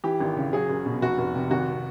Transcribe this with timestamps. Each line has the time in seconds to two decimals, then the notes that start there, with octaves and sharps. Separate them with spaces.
0.04 E3 G4
0.20 G#1
0.37 C#3
0.53 F#3 G#4
0.70 F#1
0.86 B2
1.02 F1 F#4
1.18 F1
1.35 C3
1.51 G#1 F#4